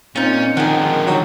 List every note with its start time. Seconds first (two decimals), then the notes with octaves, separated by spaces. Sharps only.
0.16 A#2 C4 C#4 D#4 F4
0.57 D3 D#3 F3 G#4 F#5
1.06 F#3